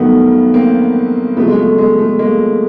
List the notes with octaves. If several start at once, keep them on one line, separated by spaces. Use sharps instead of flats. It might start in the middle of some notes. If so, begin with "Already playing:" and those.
Already playing: G2 D#3 F#3 A3 B3
A#3 C4
F2 C#3 F#3 A3 B3
G#3
A3
G#3
A3
G#3 A#3